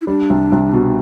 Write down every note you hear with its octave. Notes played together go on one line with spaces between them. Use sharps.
E4
G3 D4
C2
C2
B2